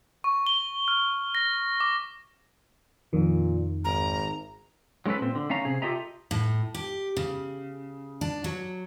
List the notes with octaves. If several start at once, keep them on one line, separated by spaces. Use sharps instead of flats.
C#6
G7
F6
A#6
D6
F2 A#2 D#3
G#1 A#5
F#3 G#3 C#4 A4 B4
A#2 C4
D3
A3 C#4 F5 A#5
C3 G#4
F4 G4 A4 D#5 E5 A#5
A2
G4
C#3
D4
F#3